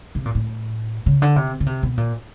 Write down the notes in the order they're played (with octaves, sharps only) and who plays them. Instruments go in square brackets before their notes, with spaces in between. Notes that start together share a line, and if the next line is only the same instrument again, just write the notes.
[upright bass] C3
A#2
A2
C#3
D3
C3
C#3
C3
B2
A#2